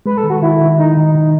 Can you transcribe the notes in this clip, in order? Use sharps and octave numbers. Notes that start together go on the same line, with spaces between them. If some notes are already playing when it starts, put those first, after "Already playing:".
G#3 B4
A4
D#3
F#4
D#3 E4
D#3
D#3 D#4
D#3
D#3